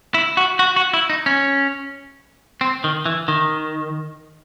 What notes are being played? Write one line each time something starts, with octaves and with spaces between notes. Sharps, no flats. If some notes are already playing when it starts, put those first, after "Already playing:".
E4
F#4
F#4
F#4
E4
D#4
C#4
C4
D#3
E3
D#3